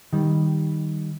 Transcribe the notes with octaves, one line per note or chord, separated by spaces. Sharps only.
D#3 G3